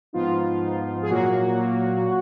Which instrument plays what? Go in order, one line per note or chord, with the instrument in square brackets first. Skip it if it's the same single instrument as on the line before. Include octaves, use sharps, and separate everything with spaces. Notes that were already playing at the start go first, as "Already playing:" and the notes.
[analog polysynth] G#2 F3 B3 D#4 F4
G#2 F3 B3 D#4
G#4
A#2 F#3 A#3 F#4
A#2 F#3 A#3
F#3